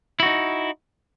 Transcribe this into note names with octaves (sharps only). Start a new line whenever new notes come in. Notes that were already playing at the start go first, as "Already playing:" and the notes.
D#4 E4 F#4